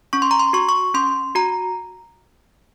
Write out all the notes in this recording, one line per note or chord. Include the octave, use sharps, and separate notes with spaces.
C#4 C#6
C6
A#5
C6
F#4 C#6
C#6
C#4 C6
F#4 A#5